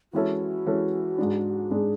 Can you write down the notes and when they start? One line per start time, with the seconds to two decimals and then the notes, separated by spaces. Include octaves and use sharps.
0.13 E3 G#3 C#4 E4 F#4 A4
0.66 E3 G#3 C#4 E4 A4
1.18 G#2 G#3 D4
1.71 G#2 G#3 D4 G#4